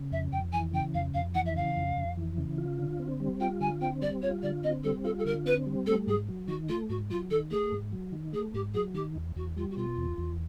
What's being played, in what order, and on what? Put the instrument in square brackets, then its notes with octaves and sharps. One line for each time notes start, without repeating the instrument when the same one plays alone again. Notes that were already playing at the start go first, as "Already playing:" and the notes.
Already playing: [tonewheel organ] C#3
[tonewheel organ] F2 [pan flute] E5
[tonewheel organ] F2 [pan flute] G5
[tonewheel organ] E3 [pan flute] G#5
[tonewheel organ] C#3 [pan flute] G5
[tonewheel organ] F2 [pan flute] F5
[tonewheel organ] F2 [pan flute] F5
[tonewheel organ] E3 [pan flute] F#5
[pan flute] E5
[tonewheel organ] C#3 [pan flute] F5
[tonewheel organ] F2
F2
E3
C#3
F4
D3
C4
G3
[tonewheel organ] F4 [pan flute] G5
[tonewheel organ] D3 [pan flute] G#5
[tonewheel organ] C4 [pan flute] G5
[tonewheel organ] G3 [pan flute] D5
[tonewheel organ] F4 [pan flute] C#5
[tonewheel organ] D3 [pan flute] D5
[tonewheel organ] C4 [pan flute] D#5
[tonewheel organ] G3 [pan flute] A4
[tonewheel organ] F4 [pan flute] A4
[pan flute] A4
[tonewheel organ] D3 [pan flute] A#4
[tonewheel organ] C4 [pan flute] B4
[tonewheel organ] G3
[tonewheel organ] A3 [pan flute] A4
[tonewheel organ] G#2 [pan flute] G#4
[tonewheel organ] F#3
[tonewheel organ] D#3 [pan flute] F#4
[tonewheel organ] A3 [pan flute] F4
[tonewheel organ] G#2 [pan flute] F#4
[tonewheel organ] F#3 [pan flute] F4
[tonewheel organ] D#3 [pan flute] A4
[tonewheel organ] A3 [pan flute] G#4
[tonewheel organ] G#2
F#3
D#3
[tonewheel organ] A3 [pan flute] G#4
[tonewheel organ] G#2 [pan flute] G4
[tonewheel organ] F#3 [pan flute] G#4
[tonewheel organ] D#3 [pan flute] G4
[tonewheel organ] E2
[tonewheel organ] E2 [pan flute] F#4
[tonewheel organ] G3 [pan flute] F4
[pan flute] F#4
[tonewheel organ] B2 [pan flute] F4
[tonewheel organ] E2
E2